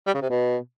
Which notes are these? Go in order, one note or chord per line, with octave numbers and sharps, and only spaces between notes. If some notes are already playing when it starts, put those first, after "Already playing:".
G3
C#3
C3
B2